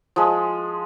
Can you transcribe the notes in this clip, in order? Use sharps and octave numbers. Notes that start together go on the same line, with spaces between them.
F3 G#3